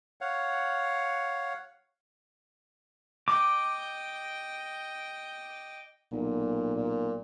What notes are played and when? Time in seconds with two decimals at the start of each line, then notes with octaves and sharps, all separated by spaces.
0.21 C#5 F5 F#5
3.28 D#5 G5 D6
6.12 B1 A#2
6.75 A#2